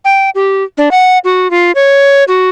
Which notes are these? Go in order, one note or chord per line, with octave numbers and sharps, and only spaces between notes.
G5
G4
D4
F#5
F#4
F4
C#5
F#4